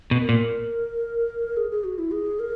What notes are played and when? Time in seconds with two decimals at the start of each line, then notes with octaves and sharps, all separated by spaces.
0.11 B2
0.20 A#4
0.29 A#2
1.57 G#4
1.71 G#4
1.84 F#4
1.98 E4
2.12 G#4
2.39 A#4